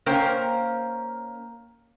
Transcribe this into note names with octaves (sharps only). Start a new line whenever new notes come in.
A#3 C#4 A#4 C5 G5